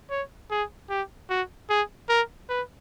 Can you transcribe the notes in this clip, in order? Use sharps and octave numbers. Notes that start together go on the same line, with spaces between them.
C#5
G#4
G4
F#4
G#4
A#4
B4